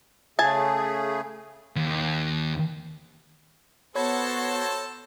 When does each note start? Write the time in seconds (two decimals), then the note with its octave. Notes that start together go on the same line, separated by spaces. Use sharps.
0.39 C#3 A3 G#4 G#5 A5
1.76 D#2
3.95 B3 F#4 A4 C5 C#5 A5 B5 G#6